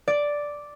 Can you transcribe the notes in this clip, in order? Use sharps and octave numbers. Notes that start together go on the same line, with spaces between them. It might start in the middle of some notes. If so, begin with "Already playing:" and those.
D5